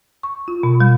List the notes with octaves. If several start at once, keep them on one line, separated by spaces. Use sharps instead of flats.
C#6
F4
B2
G3